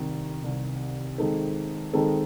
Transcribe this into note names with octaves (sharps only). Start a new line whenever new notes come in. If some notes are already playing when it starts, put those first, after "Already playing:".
Already playing: C2 C3 D#3
C2 C3 D#3
D#3 G#3 C4 D#4 A4
D#3 G#3 C4 D#4 A4